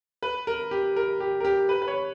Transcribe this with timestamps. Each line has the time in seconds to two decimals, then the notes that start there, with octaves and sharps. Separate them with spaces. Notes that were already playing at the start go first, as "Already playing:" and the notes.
0.23 B4
0.47 A#4
0.71 G4
0.96 A#4
1.20 G4
1.40 A#4
1.45 G4
1.69 B4
1.82 B4
1.88 C#5